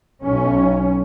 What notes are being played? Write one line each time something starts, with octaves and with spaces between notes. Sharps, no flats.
B1 C#4